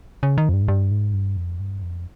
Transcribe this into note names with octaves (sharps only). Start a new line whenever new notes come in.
C#3
D#3
F2
G2
G#2
G2
G#2
G2
F2
G2
F2